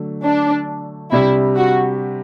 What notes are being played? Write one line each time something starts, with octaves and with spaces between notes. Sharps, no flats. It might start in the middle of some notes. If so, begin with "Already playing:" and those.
Already playing: D3 F#3 A3
D4
C3 G3 D4 E4 G4
F#4